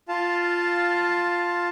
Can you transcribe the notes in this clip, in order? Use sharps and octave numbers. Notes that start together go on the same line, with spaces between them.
F4 F5 A5